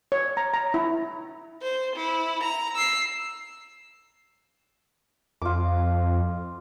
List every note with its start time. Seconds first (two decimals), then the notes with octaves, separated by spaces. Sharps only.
0.12 C#5
0.37 A#5
0.54 A#5
0.74 E4
1.62 C5
1.96 E4
2.43 A#5
2.75 E6 C7
5.42 F2 F4 D6